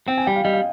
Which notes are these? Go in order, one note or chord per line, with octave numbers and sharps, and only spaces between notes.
C4 G5
G#5
G3 G5
F5
G3 D#5
F5